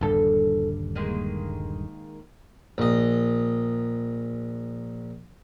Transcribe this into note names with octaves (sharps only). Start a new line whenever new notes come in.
D#1 E2 G2 D3 A4
D#3 G#3 A#3
A#1 D#5